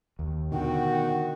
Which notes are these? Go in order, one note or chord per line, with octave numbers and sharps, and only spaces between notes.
D#2
B2 D3 D#3 F#4 G5